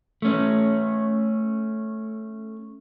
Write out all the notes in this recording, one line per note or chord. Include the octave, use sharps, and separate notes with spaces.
A3 C#4